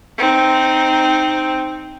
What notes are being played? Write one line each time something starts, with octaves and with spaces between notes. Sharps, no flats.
C4 D#4